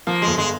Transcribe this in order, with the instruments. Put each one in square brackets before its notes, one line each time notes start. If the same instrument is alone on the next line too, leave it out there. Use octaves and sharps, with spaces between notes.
[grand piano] F3 [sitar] A#3
[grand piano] G1 [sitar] G#3
[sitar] G#3